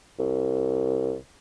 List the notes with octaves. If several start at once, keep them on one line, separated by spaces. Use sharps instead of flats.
C2